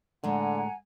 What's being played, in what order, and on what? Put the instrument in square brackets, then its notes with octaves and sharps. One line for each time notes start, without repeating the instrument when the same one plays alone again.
[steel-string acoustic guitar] A2 G#3 A3 [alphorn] D3 [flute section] F#5 G#5 A#5